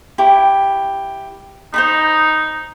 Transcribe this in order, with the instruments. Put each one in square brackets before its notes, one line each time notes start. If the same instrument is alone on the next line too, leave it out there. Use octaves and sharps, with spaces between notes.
[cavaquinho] E4 G4 C#6
[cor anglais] D#4 [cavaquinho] C5 A#5 B5